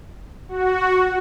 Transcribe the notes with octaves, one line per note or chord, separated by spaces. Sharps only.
F#4